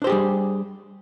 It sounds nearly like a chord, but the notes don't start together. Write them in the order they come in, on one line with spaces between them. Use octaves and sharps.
D4 C5 G4 G#4 G3